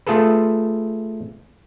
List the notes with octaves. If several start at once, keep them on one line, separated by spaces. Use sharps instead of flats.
A3 F4 G#4 A4 B4